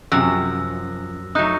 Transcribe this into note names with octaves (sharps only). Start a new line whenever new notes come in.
F#2 C3 F3 E6 F#6 A#6
F#3 A3 D#4 D#6 F#6 G6